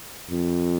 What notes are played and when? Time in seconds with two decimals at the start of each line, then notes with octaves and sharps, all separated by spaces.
0.30 F2